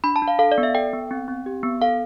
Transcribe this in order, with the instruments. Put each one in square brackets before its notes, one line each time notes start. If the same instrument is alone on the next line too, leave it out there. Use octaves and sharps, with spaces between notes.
[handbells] D4 B5
A5
D4
F5
A4 F5
D5
B3
E5
A4 G5
B3
C4
C4
G4
B3
A4 F5